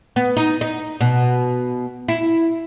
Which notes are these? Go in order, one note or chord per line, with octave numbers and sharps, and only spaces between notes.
B3
D#4
D#4
B2
E4